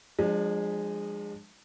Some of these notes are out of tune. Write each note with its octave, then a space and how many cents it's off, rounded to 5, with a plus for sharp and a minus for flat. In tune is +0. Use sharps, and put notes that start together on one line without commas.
F3 +20 G#3 -15 D4 +35